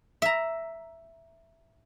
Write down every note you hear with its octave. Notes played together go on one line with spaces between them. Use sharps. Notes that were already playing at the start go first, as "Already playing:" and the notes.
E5 A#5